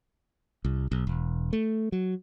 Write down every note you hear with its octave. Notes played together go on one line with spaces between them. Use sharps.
C2
B1
E1
A3
F#3